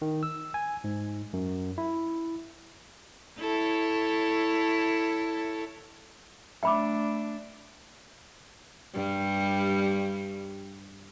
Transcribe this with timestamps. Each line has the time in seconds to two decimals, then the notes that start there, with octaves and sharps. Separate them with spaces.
0.02 D#3
0.23 E6
0.54 G#5
0.84 G#2
1.33 F#2
1.78 E4
3.39 E4 A4 C#5
6.63 A3 D4 E5 G5 B5 D6
8.94 G2 G3